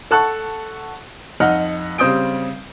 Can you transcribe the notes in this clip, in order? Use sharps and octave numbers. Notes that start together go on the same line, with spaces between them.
A4 F#5 A5 C#6 F#6
F2 D#4 D#5 F#5 F6
C#3 G3 C4 D#6 G6 D7